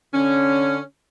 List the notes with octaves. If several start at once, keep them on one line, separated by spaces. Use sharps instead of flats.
D3 C#4